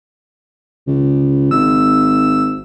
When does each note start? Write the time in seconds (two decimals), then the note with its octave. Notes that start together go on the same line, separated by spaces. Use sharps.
0.87 C#2 C#3
1.51 G#1 E6